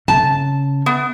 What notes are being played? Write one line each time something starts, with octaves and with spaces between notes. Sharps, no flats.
C#3 A5
B3